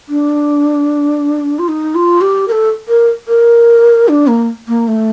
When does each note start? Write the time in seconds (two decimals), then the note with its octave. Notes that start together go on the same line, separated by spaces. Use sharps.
0.09 D4
1.59 F4
1.68 D#4
1.95 F4
2.21 G4
2.48 A#4
2.52 A4
2.88 A#4
3.28 A#4
4.08 D4
4.27 A#3
4.68 A#3
4.88 A3